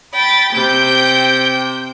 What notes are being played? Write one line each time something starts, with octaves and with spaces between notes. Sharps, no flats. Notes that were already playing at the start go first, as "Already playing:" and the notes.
G5 B5 A6
C3 G5 G6